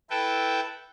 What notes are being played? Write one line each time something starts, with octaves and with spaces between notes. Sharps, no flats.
E4 A4 B4 G5